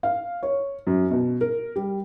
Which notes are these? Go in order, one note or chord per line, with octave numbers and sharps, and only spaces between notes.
F5
C#5
F#2
B2
A#4
G3